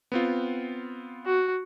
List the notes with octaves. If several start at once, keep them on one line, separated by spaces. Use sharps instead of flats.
B3 C4 F4
F#4